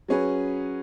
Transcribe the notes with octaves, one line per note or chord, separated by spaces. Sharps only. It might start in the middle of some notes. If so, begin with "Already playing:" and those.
F#3 C#4 G#4 B4